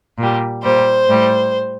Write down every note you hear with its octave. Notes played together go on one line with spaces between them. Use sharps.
A#2 G3
A#2 G3 C5
A2 G3